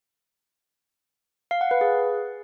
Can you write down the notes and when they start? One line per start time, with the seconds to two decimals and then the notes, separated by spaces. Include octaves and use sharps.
1.51 F5
1.61 F#5
1.71 B4
1.81 G#4